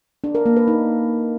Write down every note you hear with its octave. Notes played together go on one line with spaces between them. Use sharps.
D4
A#4
A#3
B4
D#4